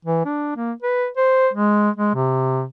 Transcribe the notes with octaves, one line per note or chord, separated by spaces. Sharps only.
E3
D4
A#3
B4
C5
G#3
G#3
C3